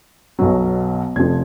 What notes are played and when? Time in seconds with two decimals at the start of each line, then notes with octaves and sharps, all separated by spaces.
0.39 B1 B2 F#3
1.16 F1 F2 F3 G#6